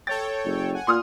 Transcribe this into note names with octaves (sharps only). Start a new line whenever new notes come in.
A4 C#5 G5 A6
F#1
F#5 G#5
A#2 C6 D#6 F6